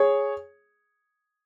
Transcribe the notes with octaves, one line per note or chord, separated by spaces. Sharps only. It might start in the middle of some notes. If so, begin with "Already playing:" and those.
Already playing: G#4 C#5